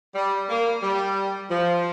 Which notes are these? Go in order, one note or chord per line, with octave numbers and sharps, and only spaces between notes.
G3
A#3
G3
F3